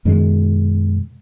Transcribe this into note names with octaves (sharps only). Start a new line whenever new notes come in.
F#2 B2 D#3 G#3